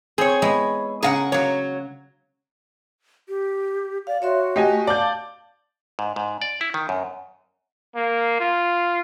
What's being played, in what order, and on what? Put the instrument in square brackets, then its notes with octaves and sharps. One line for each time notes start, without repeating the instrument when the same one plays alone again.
[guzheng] C4 [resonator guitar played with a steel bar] G#4 C#5
[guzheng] G#3 B3 E4
[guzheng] C#3 A#4 [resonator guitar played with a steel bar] G#4 F5 F#5
[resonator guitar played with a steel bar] F#3 C#5 [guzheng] A#3
[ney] G4
[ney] D5 [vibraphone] F5
[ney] F#4 [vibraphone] C#5 E5 C6
[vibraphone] A3 [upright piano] G4 D#5 G#5
[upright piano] D5 G6 [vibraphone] F5 A5 D6
[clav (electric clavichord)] G#2
G#2
D5
E4
D#3
F#2
[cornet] A#3
F4